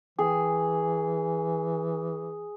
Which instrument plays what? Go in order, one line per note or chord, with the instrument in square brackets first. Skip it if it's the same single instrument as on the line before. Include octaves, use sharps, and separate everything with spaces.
[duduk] E3 [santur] G#4